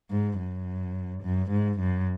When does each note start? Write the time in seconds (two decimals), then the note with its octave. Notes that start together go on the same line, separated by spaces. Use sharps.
0.11 G#2
0.39 F#2
1.23 F#2
1.51 G#2
1.79 F#2